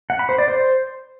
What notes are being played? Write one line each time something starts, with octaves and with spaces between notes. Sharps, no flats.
F#5
B5
C5
D5
C5